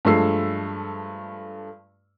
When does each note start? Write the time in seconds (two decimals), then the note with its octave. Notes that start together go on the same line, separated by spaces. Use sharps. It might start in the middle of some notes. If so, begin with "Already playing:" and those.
0.05 G2 F3 G#3 A3 E6 C7